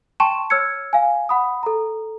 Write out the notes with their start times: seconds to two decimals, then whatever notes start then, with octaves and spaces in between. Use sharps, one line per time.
0.20 G5 A5 C6 C#6 E7
0.50 C#5 E6 F6 G#6 C#7
0.93 F5 G#5
1.29 F#5 B5 D#6
1.63 A4 A#5